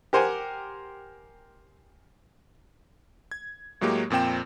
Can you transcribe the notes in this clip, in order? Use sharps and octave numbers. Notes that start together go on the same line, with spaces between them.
G4 A#4 C5 F#5 G#5
G#6
A2 F#3 G#3 A#3 G4 C#5
F2 A#2 C4 G5 E7